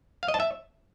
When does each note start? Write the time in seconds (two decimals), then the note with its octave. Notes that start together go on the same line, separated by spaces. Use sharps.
0.23 F5
0.28 D#5
0.34 A5
0.40 E5